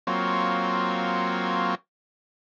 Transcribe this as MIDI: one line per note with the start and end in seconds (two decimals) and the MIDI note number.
0.07 1.75 54
0.07 1.75 58
0.07 1.75 60
0.07 1.75 65
0.07 1.75 73